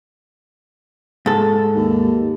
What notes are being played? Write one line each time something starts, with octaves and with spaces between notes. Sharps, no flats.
G#2 A4
D#2